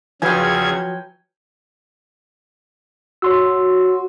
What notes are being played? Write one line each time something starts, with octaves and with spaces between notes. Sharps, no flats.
E2 C#3 F3 F#3 B4 G5 G#5 G#6
F#4 C#5 C6 E6